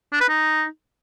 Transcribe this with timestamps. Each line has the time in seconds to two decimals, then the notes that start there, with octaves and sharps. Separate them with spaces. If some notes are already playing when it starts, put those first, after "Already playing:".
0.12 D4
0.21 B4
0.29 D#4